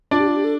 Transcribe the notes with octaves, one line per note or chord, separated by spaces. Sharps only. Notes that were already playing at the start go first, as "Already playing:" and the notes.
D4 F4 D5
G4
F4
G4
A4